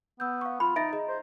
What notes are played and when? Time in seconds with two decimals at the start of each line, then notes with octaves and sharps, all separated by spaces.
0.20 B3 E6 G6
0.41 F5 C#6
0.60 F4 B5
0.76 D#4 E5 A6 D7
0.93 G#4 D#5 A#5
1.08 C5